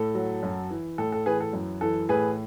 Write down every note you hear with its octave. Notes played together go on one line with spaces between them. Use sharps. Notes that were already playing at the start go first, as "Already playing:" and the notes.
Already playing: A2 A4
F#3
F#2
E3
A2 A4
A4
E3 G#4 B4
A4
F#2
E3 A4
A2 G#4 B4